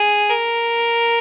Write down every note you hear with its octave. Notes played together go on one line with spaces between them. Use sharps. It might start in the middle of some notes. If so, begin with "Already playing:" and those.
Already playing: G#4
A#4